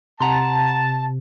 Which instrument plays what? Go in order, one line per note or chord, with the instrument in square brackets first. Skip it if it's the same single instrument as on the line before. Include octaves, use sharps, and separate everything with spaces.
[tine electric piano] C3 [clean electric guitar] F#5 A#5 C6 [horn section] A5